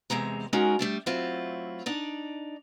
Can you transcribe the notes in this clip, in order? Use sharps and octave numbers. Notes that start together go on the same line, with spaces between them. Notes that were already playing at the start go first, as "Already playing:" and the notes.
E2 C3 G#3 A#5
G#3 C#4 D#4 F#4 A#4
G3 A3 D4
F#3 A3 C4 E4 F4
D4 D#4 D5